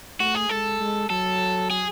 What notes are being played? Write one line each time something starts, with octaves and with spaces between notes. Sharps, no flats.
A3 F#4
G#4
G#3 A4
G#3
F#3 A4
G#4